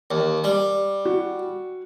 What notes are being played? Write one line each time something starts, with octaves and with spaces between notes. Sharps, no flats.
D#2
G3
F#4